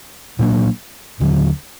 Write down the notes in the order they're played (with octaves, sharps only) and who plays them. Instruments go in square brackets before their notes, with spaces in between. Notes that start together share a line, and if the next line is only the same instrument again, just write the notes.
[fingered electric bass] A#2 F#3 A#3 D4
D#2 D3 F#3